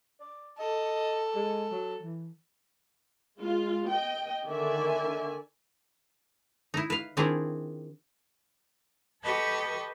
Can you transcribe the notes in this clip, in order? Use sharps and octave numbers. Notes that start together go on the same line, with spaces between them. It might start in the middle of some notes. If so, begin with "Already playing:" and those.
D5
A4 D#5
G#3
F#3
E3
G#3 F4
D#5 G5
D3 D#3 D5 E5 G#5
D#4 E4
B4 F5
D#3 C4 D4 E4 F4 G#4
G4 A4 B4 D#5 A5 C#6